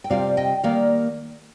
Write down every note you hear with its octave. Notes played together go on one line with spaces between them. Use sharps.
G5
C3 G3 C4 F4 D5 F5
D#5 G5
D#3 G3 A#3 D5 F5